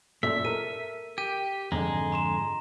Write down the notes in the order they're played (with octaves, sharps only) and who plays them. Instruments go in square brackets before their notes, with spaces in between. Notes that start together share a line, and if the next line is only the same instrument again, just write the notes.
[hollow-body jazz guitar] F#2 A#2 A3 [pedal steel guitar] E5
[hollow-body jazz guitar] A4 A#4 [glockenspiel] D#7
[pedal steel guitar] G4 [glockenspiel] D#7
[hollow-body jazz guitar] F2 G#2 D3 [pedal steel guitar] G#3 [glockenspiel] A#5
[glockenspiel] A#5 C6 E7